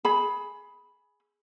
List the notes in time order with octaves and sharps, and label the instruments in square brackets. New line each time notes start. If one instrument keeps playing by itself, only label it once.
[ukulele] G#4 B5